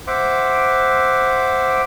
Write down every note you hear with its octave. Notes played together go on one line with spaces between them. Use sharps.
C5 E5 F#5 D6